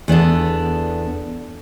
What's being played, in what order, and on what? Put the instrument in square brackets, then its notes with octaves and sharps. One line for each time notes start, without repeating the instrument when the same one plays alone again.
[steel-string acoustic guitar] E2 B3 D4 A4